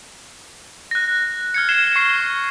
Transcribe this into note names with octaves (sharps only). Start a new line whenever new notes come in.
F#6 A#6
F6 G#6 C#7
G#6 C7 E7 G7
C#6 C7